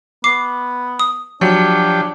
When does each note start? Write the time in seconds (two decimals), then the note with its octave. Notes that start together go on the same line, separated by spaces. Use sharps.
0.24 B3 D6 C7
0.99 D#6
1.41 F3 F#3 D4 G4